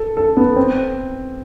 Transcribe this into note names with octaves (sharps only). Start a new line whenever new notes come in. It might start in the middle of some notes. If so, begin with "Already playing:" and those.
Already playing: A4
A4
B3
C4